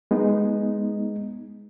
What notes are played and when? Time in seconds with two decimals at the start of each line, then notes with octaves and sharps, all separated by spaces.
0.11 G#3 B3 D#4